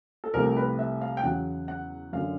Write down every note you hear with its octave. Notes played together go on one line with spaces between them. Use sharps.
A4
C2 C3 F3 A3 A#4
B4
E5
F5
G5
E2 C#3 F#3 F#5
F#5
F#2 D3 F#3 F5